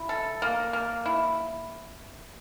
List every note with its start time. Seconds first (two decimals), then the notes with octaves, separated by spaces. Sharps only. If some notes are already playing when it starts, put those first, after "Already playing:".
Already playing: E4
0.09 A4
0.42 A#3
0.73 A#3
1.06 E4